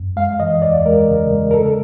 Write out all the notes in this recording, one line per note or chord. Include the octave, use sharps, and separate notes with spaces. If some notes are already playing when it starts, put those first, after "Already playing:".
Already playing: F#2
G#3 F5
E3 D#5
E2 D5
G#3 A#4
C#3
G#3
A#4
C#3 A4